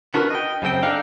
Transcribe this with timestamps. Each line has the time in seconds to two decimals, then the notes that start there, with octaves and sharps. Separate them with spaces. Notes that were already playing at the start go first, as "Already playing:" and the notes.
0.14 B3 D4 F#4 A#4 B4
0.30 D#5 G5
0.62 F#2 C#3 C4 G5
0.83 D4 D#4 A4 F5